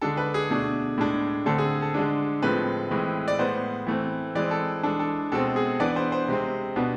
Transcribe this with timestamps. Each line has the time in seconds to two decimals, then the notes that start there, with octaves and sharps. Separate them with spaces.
0.01 D3 G#3 D4 A4
0.17 B4
0.34 G#4
0.50 B2 A3 D4
0.98 A2 G#3 D4
1.46 D3 A3 C4 A4
1.58 G#4
1.82 A4
1.94 D3 G#3 D4
2.43 A2 F3 G#3 C4 B4
2.91 A2 E3 G#3 C4
3.28 D5
3.39 A2 G#3 B3 C5
3.87 E3 A3 C4
4.35 E3 G#3 C4 D5
4.51 A4
4.83 E3 G#3 D4 A4
4.99 A4
5.32 B2 G#3 C4 A4
5.56 G#4
5.80 E3 B3 D4 D5
5.96 C5
6.12 C5
6.28 C3 G#3 C4
6.76 B2 B3 D4